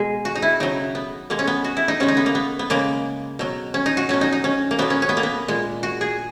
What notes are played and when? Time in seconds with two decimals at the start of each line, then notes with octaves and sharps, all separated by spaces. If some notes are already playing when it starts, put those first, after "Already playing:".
Already playing: B2 G#3 G#4
0.25 F#4
0.35 D#4
0.42 E4
0.60 C#3 F#3 D#4
0.95 B3
1.30 B2 G#3 A#3
1.39 C#4
1.47 B3
1.64 F#4
1.77 E4
1.88 D#4
2.00 C#3 G#3 C#4
2.08 D#4
2.17 B3
2.26 A#3
2.35 B3
2.59 B3
2.70 C#3 G#3 A#3
3.39 B2 F#3
3.74 C#4
3.86 D#4
3.97 F#4
4.09 B2 F#3 C#4
4.21 D#4
4.32 D#4
4.44 C#4
4.71 A#3
4.79 B2 F#3 B3
4.90 C#4
5.02 C#4
5.09 B3
5.17 A#3
5.23 B3
5.48 A#2 G#3
5.83 F#4
6.01 G#4